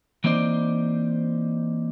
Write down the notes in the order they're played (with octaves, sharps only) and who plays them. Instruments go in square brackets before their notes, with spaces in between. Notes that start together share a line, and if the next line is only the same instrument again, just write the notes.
[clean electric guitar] E3 A#3 C4 D#4 C5 D5